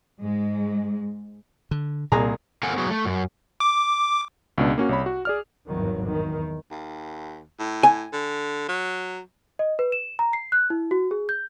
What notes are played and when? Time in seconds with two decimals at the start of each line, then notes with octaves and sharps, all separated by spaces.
0.20 G#2 G#3
1.71 D3
2.12 C2 A#2 A#3 G#4 A#5
2.63 A#3 C4 A4 A#4 F#5 G#5
2.78 F#3 B3 F#4 G#4
2.90 A3
3.05 F#2
3.60 D6
4.58 C#2 B2 D4
4.78 A#3 C#4 F#4
4.89 C2 C#5 B5
5.06 F#4
5.25 G#4 D5 F6
5.68 G#1 E2 G2 D#3 F#3
6.03 E2 D#3
6.71 D#2
7.59 A2
7.83 G#5
8.13 D3
8.68 F#3
9.59 D#5
9.79 B4
9.92 E7
10.19 A#5
10.33 C7
10.52 F#6
10.70 E4
10.91 F#4
11.11 G#4
11.29 G6